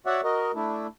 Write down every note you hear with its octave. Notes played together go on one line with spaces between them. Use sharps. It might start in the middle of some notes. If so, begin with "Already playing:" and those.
F#4 C#5 D5 E5 F#5
F#4 A#4 D#5
A3 D4 E4